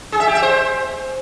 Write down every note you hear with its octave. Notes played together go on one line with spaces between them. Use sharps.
G#4
E5
G4
E5
C5